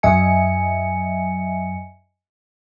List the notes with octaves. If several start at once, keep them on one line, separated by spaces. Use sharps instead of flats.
F#2 F#3 D#5 E5 G#5 C#7